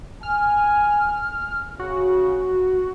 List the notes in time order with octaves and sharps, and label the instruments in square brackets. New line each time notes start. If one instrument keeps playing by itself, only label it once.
[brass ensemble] G#5 [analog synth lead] F6
[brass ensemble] C#3 [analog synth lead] F#4